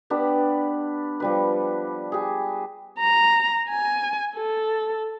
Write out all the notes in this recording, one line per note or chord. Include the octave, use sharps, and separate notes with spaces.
B3 D4 G4 B4
F3 G3 B4
G4 G#4
A#5
G#5
A4